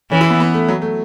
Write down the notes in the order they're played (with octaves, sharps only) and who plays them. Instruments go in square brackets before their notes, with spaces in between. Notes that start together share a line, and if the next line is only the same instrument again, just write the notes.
[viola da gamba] E3 [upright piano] C#4
[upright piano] E4
B3
B3
A3
F#3
A3